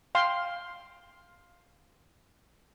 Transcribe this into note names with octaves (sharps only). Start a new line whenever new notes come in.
F5 G5 C6